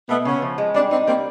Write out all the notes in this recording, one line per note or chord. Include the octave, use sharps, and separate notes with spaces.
B2 A3 B3
C#3 B3 C#4
F3
G#3
G3 C4 D4
C4 D4 D#4
G3 A#3 C4